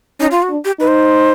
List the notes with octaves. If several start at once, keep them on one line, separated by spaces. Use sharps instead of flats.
C#4 D#4
F4
F#4
D4
G4
D#4 B4
C5